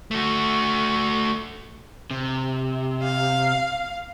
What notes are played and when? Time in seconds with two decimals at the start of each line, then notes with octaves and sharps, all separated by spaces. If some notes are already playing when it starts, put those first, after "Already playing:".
0.11 A3 F#4
2.11 C3
3.02 F5